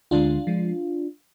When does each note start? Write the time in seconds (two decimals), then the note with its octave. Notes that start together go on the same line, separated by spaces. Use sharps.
0.11 D2 D3 G#3 D4 F4
0.47 F3 G#3